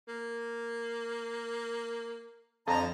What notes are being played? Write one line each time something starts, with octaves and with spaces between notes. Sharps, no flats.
A#3
F2 D3 D#5 A5 A#5